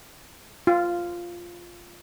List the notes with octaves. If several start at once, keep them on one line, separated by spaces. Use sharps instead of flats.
F4